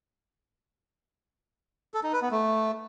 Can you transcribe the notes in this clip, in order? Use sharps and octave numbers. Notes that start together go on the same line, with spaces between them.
A4
D#4
B4
B3
A3